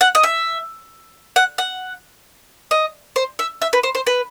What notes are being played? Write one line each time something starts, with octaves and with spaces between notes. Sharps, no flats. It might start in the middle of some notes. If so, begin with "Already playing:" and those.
F#5
D#5
E5
F#5
F#5
D#5
C5
E5
E5
B4
C5
C5
B4